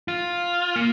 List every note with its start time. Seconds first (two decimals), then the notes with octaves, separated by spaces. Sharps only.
0.08 F4
0.76 A#3